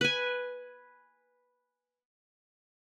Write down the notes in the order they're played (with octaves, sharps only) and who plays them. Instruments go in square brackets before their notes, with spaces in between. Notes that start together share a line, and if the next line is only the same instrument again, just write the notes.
[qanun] B4 G#5